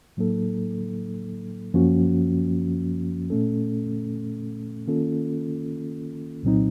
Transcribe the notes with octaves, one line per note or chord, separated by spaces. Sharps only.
A2 F#3 A#3 D#4 A4
F#2 F3 A#3 C#4 F#4
A#2 A3 C#4 A4
D#3 A#3 C#4 F4 A4
C2 A#2 F#3 C4 D#4